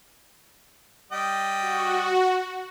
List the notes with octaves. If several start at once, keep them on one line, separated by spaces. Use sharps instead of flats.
G3 D#5 G5
F#4